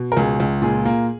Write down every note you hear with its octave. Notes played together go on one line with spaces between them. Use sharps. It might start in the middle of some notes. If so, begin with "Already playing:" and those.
Already playing: B2
A#4
C#2 G#4
C#2
A#2 G#4
A#3